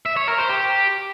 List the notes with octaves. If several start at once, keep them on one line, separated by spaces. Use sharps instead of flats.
E5
C#5
A#4
C5
G4